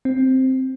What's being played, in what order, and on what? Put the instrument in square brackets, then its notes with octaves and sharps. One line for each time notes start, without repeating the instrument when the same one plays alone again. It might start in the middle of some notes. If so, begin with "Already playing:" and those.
[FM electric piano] C4